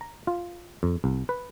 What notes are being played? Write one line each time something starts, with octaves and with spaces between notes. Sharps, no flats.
A#5
F4
F2
C2
B4